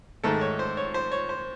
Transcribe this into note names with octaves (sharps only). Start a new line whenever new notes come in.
G#2 D#3 A3 A4
C#5
C5
C#5
C5
C#5
C5